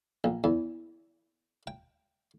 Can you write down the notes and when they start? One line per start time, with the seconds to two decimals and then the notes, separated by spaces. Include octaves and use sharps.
0.24 A#1
0.44 E2
1.67 G5